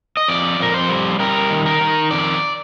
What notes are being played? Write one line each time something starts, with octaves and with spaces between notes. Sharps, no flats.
D#5
F2 D5
F2 A#4
C5
G3
G3 A#4
D#3
A#4
D#3
F2 D5